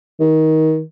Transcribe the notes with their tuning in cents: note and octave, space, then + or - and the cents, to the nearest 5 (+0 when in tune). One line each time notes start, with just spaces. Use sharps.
D#3 +20